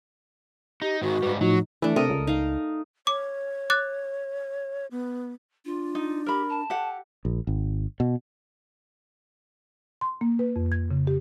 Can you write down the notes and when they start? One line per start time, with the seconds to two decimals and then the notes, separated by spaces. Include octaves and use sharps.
0.82 D#4 G4
1.02 G#2 D#3 F#4
1.23 G#2 G3 B4
1.41 A2 F3 F#3 D#4 F#4
1.82 E3 A3 D4
1.96 C3 A4 A#4 D#5
2.10 C#2
2.27 D#4 F5
3.07 C#5 D6
3.70 D6 F#6 A6
4.91 B3
5.65 D4 F4
5.95 D#4
6.26 G4 A#4 B5
6.49 A5
6.70 G4 A4 F#5
7.25 A#1
7.47 G#1
8.00 B2
10.01 C6
10.21 A#3
10.39 B4
10.56 F2
10.72 G#6
10.91 C#3
11.07 G4